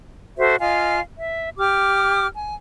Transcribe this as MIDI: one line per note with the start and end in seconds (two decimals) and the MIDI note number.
0.38 0.56 66
0.38 0.56 69
0.38 0.56 72
0.38 0.56 76
0.59 0.99 65
0.59 0.99 75
0.59 0.99 77
0.59 0.99 80
1.19 1.49 76
1.58 2.27 67
1.58 2.27 86
1.58 2.27 89
2.34 2.54 80